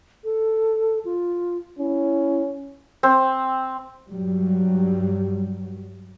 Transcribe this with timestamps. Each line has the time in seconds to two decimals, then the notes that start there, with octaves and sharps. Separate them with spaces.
0.24 A4
1.05 F4
1.79 C#4 E4
3.03 C4
4.10 G2 F#3 G3